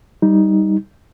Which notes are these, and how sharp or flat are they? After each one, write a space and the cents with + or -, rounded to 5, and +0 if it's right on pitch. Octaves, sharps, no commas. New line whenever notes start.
G3 +0 D#4 +10